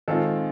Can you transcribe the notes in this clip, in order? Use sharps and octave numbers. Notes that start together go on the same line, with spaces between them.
D#3 G#3 C4 F4 A4